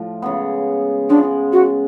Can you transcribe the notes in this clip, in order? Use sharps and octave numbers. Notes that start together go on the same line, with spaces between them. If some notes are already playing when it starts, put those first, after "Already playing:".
Already playing: A2 F3
C#3 G#3 B3
C#3 G#3 B3 D4
F#4